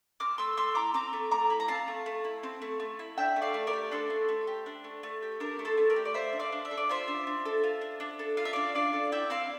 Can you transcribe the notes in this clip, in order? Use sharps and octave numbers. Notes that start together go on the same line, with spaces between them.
C4 D6 F6
A3 C6 E6
A3 C6 E6
E4 A#5 D6
C4 A#5 D6
A3
A3 A#5 D6
E4
A#5
C4 F5 A5
A3
A3
E4
C4
A3
A3
E4
D4 E5 G5
A3
D5 F5
A3
A#4 D5
G4
D4 A4 C5
A3
A3
G4
D4
A3
A3
G4
D4 A#4
A3
A4 C5
A3
A#4 D5
G4
D5
F4 C5 E5
D4
D5 F5
D4
E5
A4
D5
F4 C5 E5
D4
D4
A4
F4
D4
D4
A4
F4 F5
E5
D4 D5 F5
D4 D5 F5
A4
E4 E5 G5
C4 D5 F5